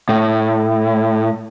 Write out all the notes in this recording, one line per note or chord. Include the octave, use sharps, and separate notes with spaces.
A2